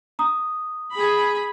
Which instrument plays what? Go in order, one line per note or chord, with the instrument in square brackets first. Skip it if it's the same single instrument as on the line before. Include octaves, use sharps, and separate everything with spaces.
[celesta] A#5 D#6
[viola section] G#4 B5